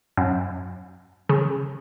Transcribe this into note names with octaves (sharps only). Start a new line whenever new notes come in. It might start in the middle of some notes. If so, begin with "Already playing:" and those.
F#2
C#3